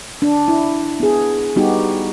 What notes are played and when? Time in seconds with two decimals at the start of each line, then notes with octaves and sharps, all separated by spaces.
0.22 D4
0.48 E4
1.00 B3 G#4
1.56 G3 B3 D#4 F#4 G4